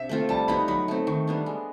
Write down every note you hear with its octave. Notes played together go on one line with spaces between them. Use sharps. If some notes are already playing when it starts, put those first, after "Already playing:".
Already playing: C3 D4 E5
A3 C4 F4
G3 A5
B3 D#4 G4 B5
F#3 B5
A3 C4
D#3 C#6
G3 B3 D4
G#3